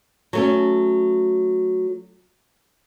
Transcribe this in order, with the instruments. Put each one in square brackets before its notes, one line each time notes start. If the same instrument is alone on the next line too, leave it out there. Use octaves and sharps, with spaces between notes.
[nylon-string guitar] F#3 A3 C#4